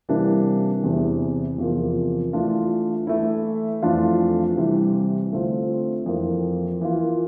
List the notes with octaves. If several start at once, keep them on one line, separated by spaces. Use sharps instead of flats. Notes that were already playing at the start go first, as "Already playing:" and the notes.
C3 E3 G3 A#3 D4
E2 C3 E3
E2 C3 F3 A#3
E3 A3 D4 F4
E3 A3 E4
F2 E3 A3 D4 F4
C3 E3 G3
D3 A3 C4 F4
F2 E3 A#3
E3 A#3 F4